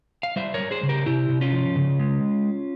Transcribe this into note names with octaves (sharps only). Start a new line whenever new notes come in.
F5
G3 C5 E5
A#4 C#5
G3
G#4 C5
C#3
G4 A#4
C3 E4 G4
C3
C#4 F4
F3
C#3
G#3